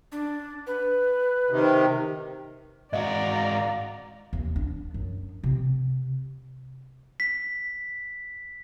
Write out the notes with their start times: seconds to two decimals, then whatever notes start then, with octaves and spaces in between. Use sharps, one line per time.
0.12 D4
0.67 B4
1.51 C3 D#3
2.93 G#2 F#4 D5 D#5 F5 A#5
4.33 D#2
4.56 D4
4.94 F#2
5.44 C3
7.20 B6